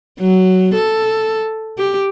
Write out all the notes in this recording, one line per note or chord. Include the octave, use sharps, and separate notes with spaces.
F#3
A4
G4